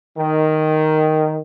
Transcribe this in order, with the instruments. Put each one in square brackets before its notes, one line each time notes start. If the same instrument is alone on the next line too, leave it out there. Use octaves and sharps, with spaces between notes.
[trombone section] D#3